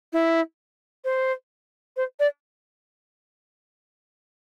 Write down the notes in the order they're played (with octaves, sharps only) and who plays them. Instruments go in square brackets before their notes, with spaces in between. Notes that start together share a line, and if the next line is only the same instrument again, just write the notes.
[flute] E4
C5
C5
D5